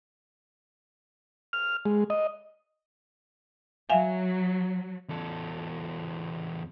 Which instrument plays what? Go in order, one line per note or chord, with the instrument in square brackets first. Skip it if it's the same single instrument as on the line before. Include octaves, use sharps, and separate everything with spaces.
[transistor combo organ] F6
G#3
D#5
[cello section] F#3 [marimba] E5 F5 G#5
[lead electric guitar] E2 A4